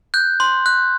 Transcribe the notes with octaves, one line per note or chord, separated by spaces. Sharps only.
F#6 G6
C6
F#6